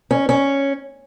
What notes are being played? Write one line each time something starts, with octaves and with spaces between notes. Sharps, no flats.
C#4
C#4